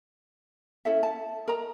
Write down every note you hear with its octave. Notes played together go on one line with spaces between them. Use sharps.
C#4 E4 A4 E5
A5
A#4 D#5 A#5